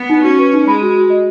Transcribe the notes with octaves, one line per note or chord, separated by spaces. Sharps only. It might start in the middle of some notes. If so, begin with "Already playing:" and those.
Already playing: B3
D#4
C#4 F#4
B4
D#4
G#3 B5
F#4
F#4
D#5